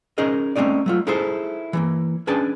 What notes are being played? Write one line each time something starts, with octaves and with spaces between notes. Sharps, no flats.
C#4 D#4 G#4 A#4 D#5
A3 C4 C#4 D#4 D5
F#3 A3 F4
D#4 E4 G#4 A4 C5 E5
E3 A3 A#3
C#4 D4 G#4 B4 G5 A5